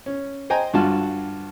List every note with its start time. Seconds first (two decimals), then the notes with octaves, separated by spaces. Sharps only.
0.06 C#4
0.50 C5 D#5 G5 G#5 A#5
0.74 G2 D3 F4 F#4 A5